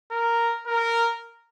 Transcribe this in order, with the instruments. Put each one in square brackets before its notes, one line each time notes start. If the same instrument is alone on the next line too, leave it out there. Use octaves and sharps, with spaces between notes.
[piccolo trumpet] A#4
A#4